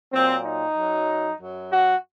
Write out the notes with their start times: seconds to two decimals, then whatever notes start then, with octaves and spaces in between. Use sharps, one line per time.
0.12 A#2 F#3 C4
0.44 D#4
0.77 F#2 F#3
1.40 F#2 F#3
1.72 F#4